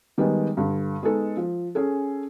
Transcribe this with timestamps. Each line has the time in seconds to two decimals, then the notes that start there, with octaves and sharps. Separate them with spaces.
0.18 D#3 G3 G#3 B3
0.57 G2 D3
1.03 G#3 B3 D#4 A4
1.37 F3
1.75 C#4 G#4 A4